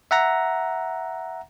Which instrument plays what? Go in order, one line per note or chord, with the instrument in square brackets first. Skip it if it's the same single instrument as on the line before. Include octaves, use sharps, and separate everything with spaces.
[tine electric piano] E5 F#5 A#5 A#6